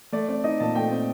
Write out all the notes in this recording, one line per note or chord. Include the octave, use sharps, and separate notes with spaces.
A3 D5
C4 D5
D#4 D#5
A#2 A5
A3 G5
C4